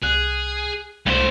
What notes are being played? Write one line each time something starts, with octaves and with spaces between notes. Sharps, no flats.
C2 G#4 F#6
C2 G2 A3 E4 C5